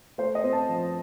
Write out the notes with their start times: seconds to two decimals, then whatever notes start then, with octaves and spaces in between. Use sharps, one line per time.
0.18 A3 C5
0.35 D#5
0.44 C4
0.53 A5
0.69 F3